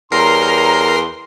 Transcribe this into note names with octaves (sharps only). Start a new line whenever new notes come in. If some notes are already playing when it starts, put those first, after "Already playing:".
E2 G3 A#4 C#5 A#5 C6 C7